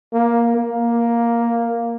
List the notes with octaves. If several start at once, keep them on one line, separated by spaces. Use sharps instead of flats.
A#3
A#3